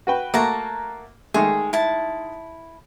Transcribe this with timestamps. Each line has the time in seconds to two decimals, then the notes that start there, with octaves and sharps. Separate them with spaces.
0.07 F#4 B4 G5
0.34 A3 A#3 F#4 A#4 A5 A#5
1.34 D#3 G#3 A3 G#4
1.73 E4 A5